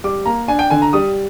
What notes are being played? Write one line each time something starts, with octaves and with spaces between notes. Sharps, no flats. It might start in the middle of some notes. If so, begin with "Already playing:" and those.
G3 D6
A#3 A#5
D4 G#5
G5
D3 G#5
A#5
G3 D#6